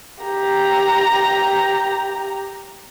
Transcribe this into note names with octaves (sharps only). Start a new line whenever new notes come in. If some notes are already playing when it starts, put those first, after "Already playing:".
G4 A#5